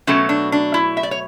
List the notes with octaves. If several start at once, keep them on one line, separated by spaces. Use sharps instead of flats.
B2 F#3 A3 C#4
D4
D4
E4
E5
D5
C#5